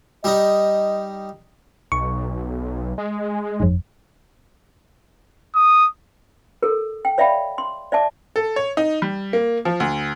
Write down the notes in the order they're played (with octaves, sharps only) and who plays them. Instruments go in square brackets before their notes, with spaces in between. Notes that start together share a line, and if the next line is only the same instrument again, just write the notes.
[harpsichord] G3 D#4 [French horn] D#5
[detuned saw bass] B1 [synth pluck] C#6
[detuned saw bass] G#3
[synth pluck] G1 F2
[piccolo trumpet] D#6
[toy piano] A4 A#4
G5
C#5 D5 E5 F5 G5 B5
C6
D5 E5 A5 D6
[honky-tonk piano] A4
C#5
D#4
G3
A#3
F3
D2